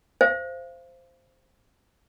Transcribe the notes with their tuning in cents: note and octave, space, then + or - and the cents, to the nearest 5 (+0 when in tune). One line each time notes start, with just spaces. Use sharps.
C5 +0 F5 -30